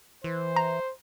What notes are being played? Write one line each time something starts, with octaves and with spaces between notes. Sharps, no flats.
E3 C5
A#5